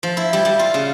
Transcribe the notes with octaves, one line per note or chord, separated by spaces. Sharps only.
F3
E4
G3
G3
F4
C#3